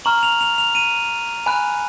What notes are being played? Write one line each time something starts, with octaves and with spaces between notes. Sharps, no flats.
A#5 C#6 F6 F#7
F7
F7
F7
D#7
G#5 B5 F#6